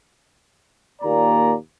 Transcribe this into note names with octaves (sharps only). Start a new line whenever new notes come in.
D#2 A#2 D5 A#5